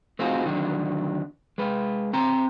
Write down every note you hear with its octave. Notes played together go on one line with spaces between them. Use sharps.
A3 C4 D#4 F4 F#4 G#4
D2 D#3 F#3 D4
G#3 B4
C4 A#5 C6